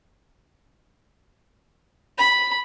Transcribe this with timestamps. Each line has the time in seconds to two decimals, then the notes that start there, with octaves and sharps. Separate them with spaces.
2.18 B5